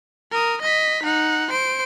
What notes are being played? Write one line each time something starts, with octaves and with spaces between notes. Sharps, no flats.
A#4 D#6
D#5 B6
D#4 F#5
C5 D7